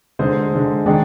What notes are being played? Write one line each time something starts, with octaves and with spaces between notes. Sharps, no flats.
D3 G#3 D#4 G#4 C5
D3 G#3 D#4
D#3 G#3 D4